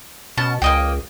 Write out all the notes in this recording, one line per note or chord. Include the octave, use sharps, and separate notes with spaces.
B2 C#4 A5
C#2 A#3 D#5 G5